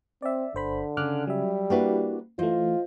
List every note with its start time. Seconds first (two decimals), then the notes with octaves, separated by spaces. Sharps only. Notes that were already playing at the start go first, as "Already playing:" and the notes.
0.22 C4 D5 E5
0.55 G1 D3 C5 B5
0.97 C#3 D6 F6 F#6
1.27 F#3 G3 E5
1.70 A#3 D4 E4 F#4 G4 B4
2.39 E3 A3 F4 C5 D#5